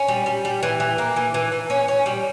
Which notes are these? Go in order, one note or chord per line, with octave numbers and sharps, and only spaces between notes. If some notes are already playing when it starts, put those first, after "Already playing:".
Already playing: C#4
G3
G3
G3
E3
E3
A#3
E3
E3
E3
C#4
C#4
G3